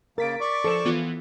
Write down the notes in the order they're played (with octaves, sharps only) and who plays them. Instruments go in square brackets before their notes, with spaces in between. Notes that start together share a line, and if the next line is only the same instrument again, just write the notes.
[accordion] C#3 A#3 [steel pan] A#4 [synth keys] A6 B6 D7
[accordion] D5 C#6 D6
[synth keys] F3 C#7 E7 [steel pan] A4 C5
[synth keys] E3 B3 F4